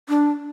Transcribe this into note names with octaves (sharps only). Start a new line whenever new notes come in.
D4